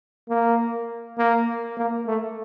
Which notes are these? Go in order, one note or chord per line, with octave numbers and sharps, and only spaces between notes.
A#3
A#3
A#3
A3